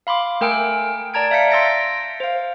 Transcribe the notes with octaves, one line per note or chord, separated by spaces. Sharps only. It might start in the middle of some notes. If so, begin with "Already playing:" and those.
F5 B5 C6 D6
A3 A#4 G5 G#5 E6 D7
D5 A5 A#5 G#6 D7
E5 F5 G6 B6 C#7
C6 E6 A6 A#6 C#7 D7
C5 F5